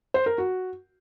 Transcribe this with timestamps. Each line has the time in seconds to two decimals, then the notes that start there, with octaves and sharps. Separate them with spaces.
0.14 C5
0.26 A#4
0.38 F#4